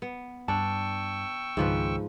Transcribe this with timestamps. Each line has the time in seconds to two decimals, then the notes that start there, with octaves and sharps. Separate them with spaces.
0.02 B3
0.48 G2 D4 G5 A5 C#6 E6
1.57 C#2 G#2 D#3 F3 B4